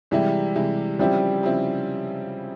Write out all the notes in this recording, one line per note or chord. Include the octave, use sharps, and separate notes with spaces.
C3 E3 G3 G#3 E4
C3 E3 G#3 E4
C#3 F3 G3 C4 E4
C#3 F3 C4 E4